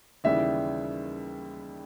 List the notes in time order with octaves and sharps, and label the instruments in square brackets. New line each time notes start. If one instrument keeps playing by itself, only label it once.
[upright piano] D#2 C#3 E3 G3 [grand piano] E5